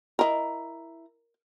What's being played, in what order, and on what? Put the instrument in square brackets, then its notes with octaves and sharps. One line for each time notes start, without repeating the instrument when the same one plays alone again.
[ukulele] E4 A#5 [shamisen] A#4 D#5